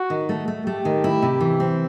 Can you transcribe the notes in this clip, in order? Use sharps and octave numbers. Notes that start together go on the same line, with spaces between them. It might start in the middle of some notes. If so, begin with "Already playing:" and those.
Already playing: F#4
D#3
A3
A3
A3 G4
D#3
E4
C3
E3
C4